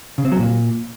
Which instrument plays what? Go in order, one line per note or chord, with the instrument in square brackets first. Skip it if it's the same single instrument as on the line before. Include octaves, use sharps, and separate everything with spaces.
[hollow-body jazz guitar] C#3
C4
F#3
A#2